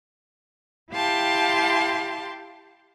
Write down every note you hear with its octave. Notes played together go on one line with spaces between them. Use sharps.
E4 G4 F5 G5 A5 C6